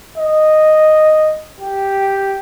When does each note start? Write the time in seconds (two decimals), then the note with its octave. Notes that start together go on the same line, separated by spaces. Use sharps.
0.18 D#5
1.60 G4